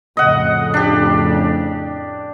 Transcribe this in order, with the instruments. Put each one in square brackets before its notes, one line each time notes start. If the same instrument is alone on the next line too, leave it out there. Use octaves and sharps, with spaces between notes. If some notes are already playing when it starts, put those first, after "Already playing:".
[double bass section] F2 A2 C#3 [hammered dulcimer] D#5 F#5
[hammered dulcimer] D4 G4